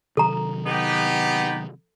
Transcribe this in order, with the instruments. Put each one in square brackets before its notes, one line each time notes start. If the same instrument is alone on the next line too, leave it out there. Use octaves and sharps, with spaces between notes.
[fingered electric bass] C3 D#3 F#3 [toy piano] A4 A#5
[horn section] B3 D#4 G4